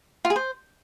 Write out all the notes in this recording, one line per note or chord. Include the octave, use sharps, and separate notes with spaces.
F4
G#4
C5